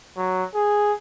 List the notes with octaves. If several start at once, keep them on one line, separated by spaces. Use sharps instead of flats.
F#3
G#4